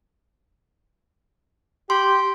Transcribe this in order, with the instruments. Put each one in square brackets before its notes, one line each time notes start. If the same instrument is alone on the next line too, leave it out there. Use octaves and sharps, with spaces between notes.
[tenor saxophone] G4 [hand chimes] C6